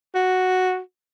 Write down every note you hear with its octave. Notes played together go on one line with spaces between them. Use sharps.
F#4